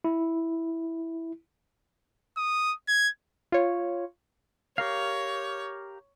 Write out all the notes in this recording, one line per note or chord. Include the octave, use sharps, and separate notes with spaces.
E4
D#6
G#6
F4 C#5
G4 A#4 C#5 F5